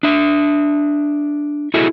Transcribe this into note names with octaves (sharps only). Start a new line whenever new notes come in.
D4 E5
E4 F#4 G#4 A4 E5